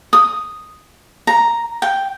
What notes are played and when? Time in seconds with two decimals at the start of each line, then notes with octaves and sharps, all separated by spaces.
0.13 D#6
1.27 A#5
1.82 G5